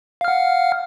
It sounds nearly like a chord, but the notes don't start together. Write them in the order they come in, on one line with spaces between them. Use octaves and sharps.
F5 F6 F#5